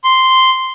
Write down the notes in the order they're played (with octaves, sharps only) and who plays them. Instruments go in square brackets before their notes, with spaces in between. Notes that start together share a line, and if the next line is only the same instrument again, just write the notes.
[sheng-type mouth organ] C6